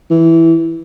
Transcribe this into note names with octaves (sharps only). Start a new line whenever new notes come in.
E3